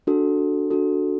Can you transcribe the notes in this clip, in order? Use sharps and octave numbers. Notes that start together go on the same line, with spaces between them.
D4 F#4 A4
D4 F#4 A4